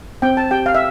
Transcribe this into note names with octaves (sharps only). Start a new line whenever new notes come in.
C4 G5
A5
G4 G5
F5
E5